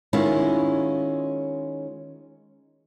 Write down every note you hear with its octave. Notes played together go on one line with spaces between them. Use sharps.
D#3 G#3 B3 C#4 E4 F4